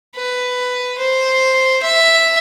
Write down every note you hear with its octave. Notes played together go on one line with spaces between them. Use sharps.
B4
C5
E5